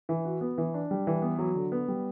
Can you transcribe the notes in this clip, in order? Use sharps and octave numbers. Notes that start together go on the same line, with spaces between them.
E3
F#4
B3
E3
D4
G3
E3
B3
F#3
D3
B3
G3